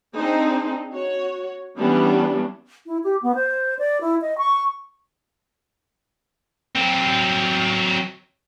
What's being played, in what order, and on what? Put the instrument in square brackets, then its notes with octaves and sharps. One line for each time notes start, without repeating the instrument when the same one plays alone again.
[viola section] C4 D4 D#4 G#4 C5
F#4 C#5
E3 G3 B3 C#4 D4
[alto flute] E4
G4
B3
C5
D5
E4
D#5
C#6
[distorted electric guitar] F#3 C4